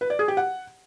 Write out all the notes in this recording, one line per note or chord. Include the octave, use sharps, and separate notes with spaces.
B4
D5
G#4
G4
F#5